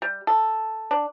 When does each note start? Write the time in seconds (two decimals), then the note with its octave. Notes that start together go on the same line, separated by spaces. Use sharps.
0.02 G3
0.27 A4
0.91 D4